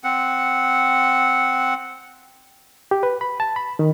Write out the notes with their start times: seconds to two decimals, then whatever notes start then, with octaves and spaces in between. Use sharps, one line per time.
0.04 C4 F#5
2.91 G4
3.03 B4
3.21 B5
3.40 A5
3.56 B5
3.79 D#3